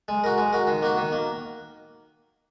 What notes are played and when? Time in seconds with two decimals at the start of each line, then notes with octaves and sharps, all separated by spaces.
0.08 G#3
0.24 F#4 A#4
0.38 G#3
0.53 F#4 A#4
0.67 D#3
0.82 A#3 F#4
0.97 D#3
1.12 A#3